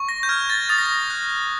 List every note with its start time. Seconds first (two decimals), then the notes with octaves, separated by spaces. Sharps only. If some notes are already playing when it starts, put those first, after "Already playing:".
Already playing: C#6
0.09 A#6
0.23 G6
0.29 F6 G#6
0.50 A6
0.69 D#6 A6
0.78 A#6
0.86 A6
1.10 F#6